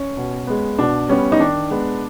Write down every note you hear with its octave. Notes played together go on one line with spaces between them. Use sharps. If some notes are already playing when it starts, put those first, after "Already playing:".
Already playing: C#4
B2
G#3 B3
B2 D4
G3 B3 C#4
D#4
D#3 D4
G#3 B3